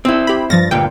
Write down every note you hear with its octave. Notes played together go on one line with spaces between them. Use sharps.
C4 E4
G4 B5
G2 F3 A6 A#6
D2 G2 A#2 G5